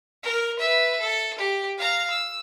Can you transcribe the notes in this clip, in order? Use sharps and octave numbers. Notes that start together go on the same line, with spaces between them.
A#4
B4 E5
A4
G4
F5 A#5
E6